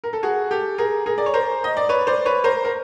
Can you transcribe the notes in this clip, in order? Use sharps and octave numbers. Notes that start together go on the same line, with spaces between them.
A#4
A4
F#4 G#4
G4 A4
G#4 A#4
G#4 A#4
D5
C#5
A#4 C5
D#5
D5
B4 C#5
C5 D5
B4 C#5
A#4 C5
A#4